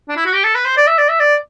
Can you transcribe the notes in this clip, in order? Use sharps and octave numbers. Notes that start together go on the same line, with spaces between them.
D4
E4
F#4
G4
A4
B4
C5
D5
E5
D5
E5
D5